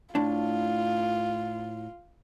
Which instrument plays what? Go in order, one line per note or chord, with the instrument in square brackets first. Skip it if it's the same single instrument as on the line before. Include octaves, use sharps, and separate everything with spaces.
[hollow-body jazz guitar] A2 D4 [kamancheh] F4